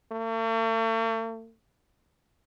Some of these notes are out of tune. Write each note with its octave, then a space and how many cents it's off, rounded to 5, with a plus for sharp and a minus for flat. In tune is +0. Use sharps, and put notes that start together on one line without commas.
A3 +45